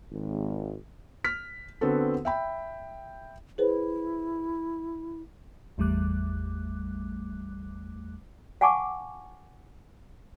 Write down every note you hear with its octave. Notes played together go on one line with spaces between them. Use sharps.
G#1
F6 B6
D3 B3 C4 F#4 A4
E5 G5 B5
E4 G#4 B4 C5
G#1 E2 G3 A3 D6 F#6
F5 F#5 G#5 A5 C#6 D6